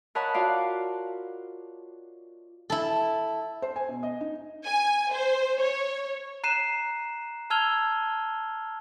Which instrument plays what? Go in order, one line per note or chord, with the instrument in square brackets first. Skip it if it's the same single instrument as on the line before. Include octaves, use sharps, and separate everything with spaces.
[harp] A#4 C#5 D#5 F#5 A5 B5
F4 F#4 D5 F5 F#5
[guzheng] E4 A4
[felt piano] C5
G#5
B2
D#5
D#4
[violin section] G#5
C5
C#5
[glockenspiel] A#5 F#6 C7 D#7 E7
A5 E6 F6 G#6 F7 G7